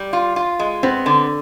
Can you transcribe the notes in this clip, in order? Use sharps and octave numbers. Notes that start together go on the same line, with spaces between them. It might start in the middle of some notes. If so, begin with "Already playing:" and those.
Already playing: G3
F4
F4
G#3
B3 C4
D3